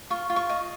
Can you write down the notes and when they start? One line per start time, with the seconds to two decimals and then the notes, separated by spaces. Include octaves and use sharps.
0.10 F4 C#6
0.30 F4
0.36 C#6
0.49 D#5